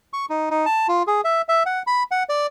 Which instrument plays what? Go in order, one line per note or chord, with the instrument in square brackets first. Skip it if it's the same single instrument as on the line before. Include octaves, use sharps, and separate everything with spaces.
[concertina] C#6
D#4
D#4
A5
F4
G#4
E5
E5
F#5
B5
F#5
D5